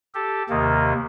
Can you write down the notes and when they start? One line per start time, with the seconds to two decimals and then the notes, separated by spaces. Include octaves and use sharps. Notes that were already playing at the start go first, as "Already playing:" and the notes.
0.14 G4 A4
0.50 D#2 C3 D#3 A#3